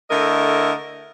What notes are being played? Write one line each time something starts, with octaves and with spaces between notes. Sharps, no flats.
D3 A3 E4 A#4 D#5